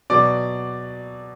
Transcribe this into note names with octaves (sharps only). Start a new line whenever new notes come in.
B2 F#3 D5 D6